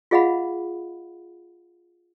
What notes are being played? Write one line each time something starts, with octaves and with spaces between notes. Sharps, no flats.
F4 G#4 D#5 F5 F#5 B5